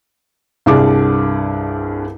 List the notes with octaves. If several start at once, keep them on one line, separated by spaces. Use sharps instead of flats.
C2 G2 D4 G#4 D6